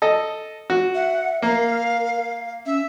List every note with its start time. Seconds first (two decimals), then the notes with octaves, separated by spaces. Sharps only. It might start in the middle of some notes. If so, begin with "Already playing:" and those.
0.02 A4 D#5
0.70 F#4
0.95 E5 F#5
1.42 A#3 A#4 F5
2.66 C#4 E5